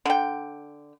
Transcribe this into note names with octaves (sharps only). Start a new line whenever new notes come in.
D3 G5